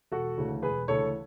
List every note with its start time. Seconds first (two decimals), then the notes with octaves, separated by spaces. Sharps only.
0.11 E1 F#4 A4
0.38 D2 C#3 E3
0.62 E1 G#4 B4
0.88 D2 C#3 E3 A4 C#5